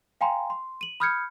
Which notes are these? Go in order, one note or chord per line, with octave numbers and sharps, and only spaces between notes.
F5 G5 G#5 A#5 C6
C6
D#7 F#7
B5 D#6 F6 G6 G#6 C#7